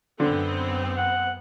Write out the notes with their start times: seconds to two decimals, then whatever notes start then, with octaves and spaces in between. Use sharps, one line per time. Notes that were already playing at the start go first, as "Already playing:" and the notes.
0.20 F#2 D3 B3 C4
0.97 F#5